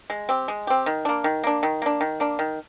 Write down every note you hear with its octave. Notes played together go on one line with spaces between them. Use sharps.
G#3
C4 G4
G#3
C4 G4
D#3
A#3 D4
D#3
A#3 D4
D#3
A#3 D4
D#3
A#3 D4
D#3